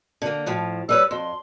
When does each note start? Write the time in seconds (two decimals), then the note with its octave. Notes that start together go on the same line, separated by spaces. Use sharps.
0.22 D3 A#3
0.46 F2 A2 F3
0.89 G3 B4 C#5 E6
1.11 F2 C6